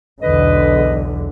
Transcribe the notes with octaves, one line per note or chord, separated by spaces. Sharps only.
B1 E2 D3 B4 D#5